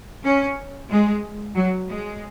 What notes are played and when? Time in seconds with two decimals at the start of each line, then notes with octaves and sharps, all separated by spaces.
0.24 C#4
0.91 G#3
1.56 F#3
1.88 G#3